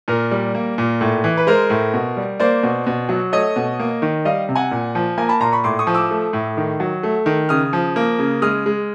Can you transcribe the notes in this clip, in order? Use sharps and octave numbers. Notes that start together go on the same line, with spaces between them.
A#2 A#4
G3
A#3
A#2
A2
E3
B4
G#3 A#4 C5
A2
B2
G3
A#3 C5 D5
B2
B2
F#3
A3 C#5 D#5
B2
A#3
D#3
G3 D#5 F5
C3
F#5 G#5
A#2
F3
A#3 G#5 A#5
A5 B5
A#2 A#5 C6
B5 C#6
A2 C6 D6
C#6 D#6
F3
D6 E6
A3
A2
D#3
F#3
A3
D#3
C#3 D#6 F6
F3
A#3
C#3
G#3 D#6 F6
G#3